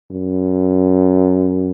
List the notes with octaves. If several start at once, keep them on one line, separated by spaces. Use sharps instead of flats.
F#2